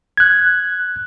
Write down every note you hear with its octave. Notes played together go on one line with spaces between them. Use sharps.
F#6 G#6